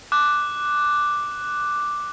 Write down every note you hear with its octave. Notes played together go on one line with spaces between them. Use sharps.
D6 F#6